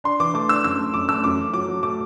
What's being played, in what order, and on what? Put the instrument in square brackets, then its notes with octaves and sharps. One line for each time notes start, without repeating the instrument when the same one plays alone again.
[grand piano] D4 C6
E3 D6
A3 D6
D4 E6
F#2 E6
A3
F#2 D6
A3 E6
F#2 D6
F#2
F#3 D6
F#3
A3 D6